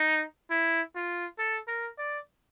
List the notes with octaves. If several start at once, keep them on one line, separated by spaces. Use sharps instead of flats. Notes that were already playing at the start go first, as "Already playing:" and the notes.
Already playing: D#4
E4
F4
A4
A#4
D5